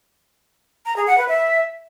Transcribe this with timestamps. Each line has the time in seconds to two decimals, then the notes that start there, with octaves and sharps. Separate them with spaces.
0.86 A#5
0.96 G#4
1.07 F#5
1.18 B4
1.28 E5